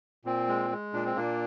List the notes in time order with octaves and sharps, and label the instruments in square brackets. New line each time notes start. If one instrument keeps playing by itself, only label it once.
[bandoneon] A#2 C4
G#3
G#3
A#2 D4
C4
A#2 A#3 D4